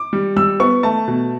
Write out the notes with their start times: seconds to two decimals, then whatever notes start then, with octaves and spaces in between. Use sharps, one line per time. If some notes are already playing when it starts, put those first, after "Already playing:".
Already playing: D6
0.13 G3
0.36 G3 E6
0.60 B3 C#6
0.83 A3 A5
1.08 B2